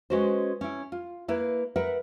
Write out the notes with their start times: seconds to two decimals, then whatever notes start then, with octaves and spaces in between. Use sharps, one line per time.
0.10 G#3 C#4 F#4 B4 C5
0.61 C#4 E4
0.92 F4
1.28 A#3 E4 B4
1.76 A#4 B4 E5 F#5